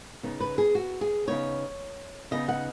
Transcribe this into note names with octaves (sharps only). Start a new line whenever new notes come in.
C#3 B3 D#4
B4
G#4
F#4
G#4
C#3 B3 D#4 C#5
C#3 B3 D#4 D#5
F#5